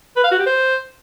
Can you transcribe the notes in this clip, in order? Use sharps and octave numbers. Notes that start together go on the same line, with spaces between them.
B4
F5
F#4
G4
C5